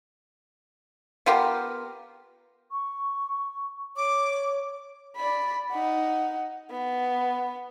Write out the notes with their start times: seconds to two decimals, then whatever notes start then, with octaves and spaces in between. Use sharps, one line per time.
1.26 B3 F4 G4 A#4
2.72 C#6
3.97 C#5 D6
5.16 D5 B5
5.71 D#4 F#5
6.70 B3